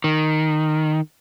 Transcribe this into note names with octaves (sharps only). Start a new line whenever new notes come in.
D#3